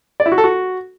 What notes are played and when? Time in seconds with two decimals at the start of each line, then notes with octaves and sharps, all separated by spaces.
0.20 D5
0.26 E4
0.32 F#4
0.38 A4
0.44 F#4